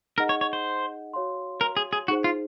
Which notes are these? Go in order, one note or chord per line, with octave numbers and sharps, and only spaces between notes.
D#4 G#4 A#4 D#5 F#5
C#5
C#5
C5
F#4 C#5 F5 C6
A#4
G#4
G#4
D#4 F#4 G#4 C5
F4